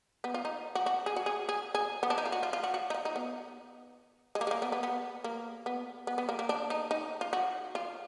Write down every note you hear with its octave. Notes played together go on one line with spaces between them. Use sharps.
B3
F4
D#4
F#4
F#4
G#4
F#4
G#4
G#4
G#4
B3
D4
D#4
F4
F#4
F4
F4
F#4
F#4
D#4
F4
D#4
B3
G#3
A#3
G#3
A#3
B3
B3
B3
A#3
B3
B3
B3
A#3
A#3
D4
D#4
D#4
F4
F#4
F4